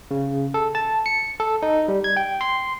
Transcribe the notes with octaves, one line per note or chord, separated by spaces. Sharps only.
C#3
A4
A5
C#7
A4
D#4
G3
G#6
G5
C6